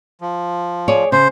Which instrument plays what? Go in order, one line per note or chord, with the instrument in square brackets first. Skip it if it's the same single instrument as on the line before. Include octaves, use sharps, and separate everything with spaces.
[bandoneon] F3
[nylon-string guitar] G#4 C#5 D5
[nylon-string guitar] C#3 [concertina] C5